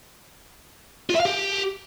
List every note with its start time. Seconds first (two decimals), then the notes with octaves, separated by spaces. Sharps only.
1.10 F4
1.15 E5
1.20 F5
1.25 G4